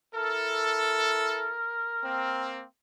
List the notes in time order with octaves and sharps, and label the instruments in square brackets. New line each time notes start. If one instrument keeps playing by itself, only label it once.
[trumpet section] E4 A4 [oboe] A#4
[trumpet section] A#3 C4